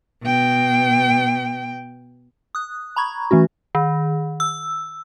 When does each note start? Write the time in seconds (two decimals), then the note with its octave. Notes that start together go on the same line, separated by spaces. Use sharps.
0.23 B2 G5
2.55 D#6 F#6
2.96 A#5 B5 C#6 G#6
3.31 E3 A3 C#4 F#4
3.75 D#3
4.40 E6